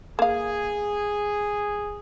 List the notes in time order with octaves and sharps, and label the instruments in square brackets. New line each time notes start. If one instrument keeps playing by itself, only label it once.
[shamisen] A#3 F5 [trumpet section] G#4